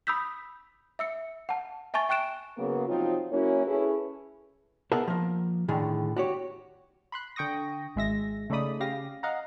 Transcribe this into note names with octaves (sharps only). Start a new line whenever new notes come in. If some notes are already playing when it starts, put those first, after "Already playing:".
B5 D#6 E6 G6 B6
E5 E6 C#7
F#5 A5
E5 G#5 A5 C#6 A6
G5 C#6 F#6 D7 E7
C#3 F#3 A#3 B3 G#4 A#4
C3 F3 F#3 C4 D#4 F4
F#2 A#3 C#4 E4 F#4 C#5
C#4 E4 G#4 A4 B4
B3 G#4 A#4 E5 F#5 A5
F3 A#3
A2 D3 D#3 G#4
F#4 G4 C#5
B5 C6 F#6
D3 G5 C#6 D#6 A#6
G#1 G#3 E5 A#6
C#3 A3 D#4 D5 B5 D#6
C#3 G4 F5 A#6
D#5 F5 F#5 A#5